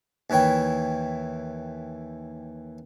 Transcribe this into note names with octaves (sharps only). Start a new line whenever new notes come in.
D#2 E3 E4 C#5 G5